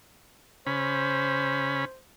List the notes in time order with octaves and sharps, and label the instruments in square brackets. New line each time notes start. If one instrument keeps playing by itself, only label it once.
[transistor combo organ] C#3 C#4 B5 [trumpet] C5